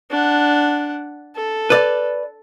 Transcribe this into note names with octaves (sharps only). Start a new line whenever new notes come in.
D4 F#5
A4
B4 D5